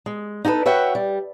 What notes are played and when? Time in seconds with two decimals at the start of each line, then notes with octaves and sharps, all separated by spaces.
0.06 G#3
0.45 D#4 F#4 G#4 A4 B4
0.65 F#4 B4 C#5 E5 F#5 G5
0.95 G3